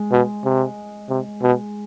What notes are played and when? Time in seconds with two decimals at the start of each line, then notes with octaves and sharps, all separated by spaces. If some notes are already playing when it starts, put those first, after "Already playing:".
Already playing: G#3
0.12 B2
0.45 C3
1.09 C3
1.43 B2